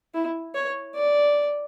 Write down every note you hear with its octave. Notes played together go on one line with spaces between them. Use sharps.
E4
C#5
D5